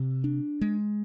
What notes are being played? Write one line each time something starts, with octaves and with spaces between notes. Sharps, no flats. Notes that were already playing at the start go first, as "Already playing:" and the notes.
Already playing: C3
D4
G#3